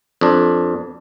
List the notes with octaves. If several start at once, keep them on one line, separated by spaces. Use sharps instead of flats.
F2 D4